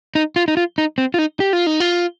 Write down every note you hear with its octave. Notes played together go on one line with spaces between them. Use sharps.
D#4
F4
D#4
F4
D#4
C4
F4
D#4
G4
F4
D#4
F4